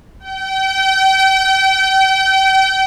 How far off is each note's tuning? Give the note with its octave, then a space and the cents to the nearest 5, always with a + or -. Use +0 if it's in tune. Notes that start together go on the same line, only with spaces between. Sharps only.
G5 -35